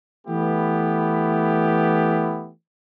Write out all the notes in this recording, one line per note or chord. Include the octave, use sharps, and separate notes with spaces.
E3 A3 B3 E4 G4